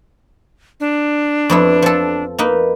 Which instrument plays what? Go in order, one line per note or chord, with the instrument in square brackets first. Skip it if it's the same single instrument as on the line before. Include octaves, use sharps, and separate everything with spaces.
[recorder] D4
[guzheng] F2 B3 E4
F3 A4
A#3 D#4 B4